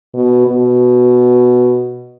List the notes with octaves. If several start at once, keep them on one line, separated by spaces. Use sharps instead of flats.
B2
B2